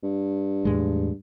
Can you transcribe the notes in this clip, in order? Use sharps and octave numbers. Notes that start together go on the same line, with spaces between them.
G2
E2 A2 G#3